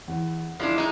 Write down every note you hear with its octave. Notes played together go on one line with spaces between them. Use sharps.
E2
F3 G#3 D4 E4
G#3 D#4